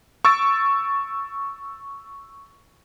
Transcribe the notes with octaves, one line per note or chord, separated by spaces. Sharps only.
C#6 E6 A6 D7